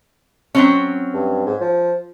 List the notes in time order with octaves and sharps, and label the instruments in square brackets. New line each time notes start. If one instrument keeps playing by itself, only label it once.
[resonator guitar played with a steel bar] F#3 C4 C#4
[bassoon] G2
G#2
F3